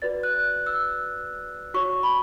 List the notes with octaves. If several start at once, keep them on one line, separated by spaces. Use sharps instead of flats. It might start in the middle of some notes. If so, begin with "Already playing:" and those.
F#4 B4 D5 A6
F#6
E6
F#4 C#5 C#6
B5